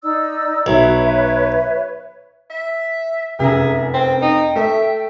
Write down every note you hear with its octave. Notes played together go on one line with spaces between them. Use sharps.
D#4 D5 E6
B1 B4 C#5 E5
E5
F1 F#2 G#4 E5 A#5
C4 G5
D#4
A3 A4 E5